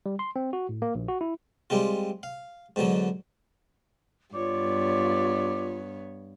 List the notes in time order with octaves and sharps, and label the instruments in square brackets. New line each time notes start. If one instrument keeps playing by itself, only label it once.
[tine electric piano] G3
C6
C4
F#4
A2
A#3
A#1
F#4
E4
[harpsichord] G3 G#3 C4 F4
F5
G#2 B2 D3 F#3
[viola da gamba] G2 B3 [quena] F4 [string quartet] C#5 [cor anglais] D5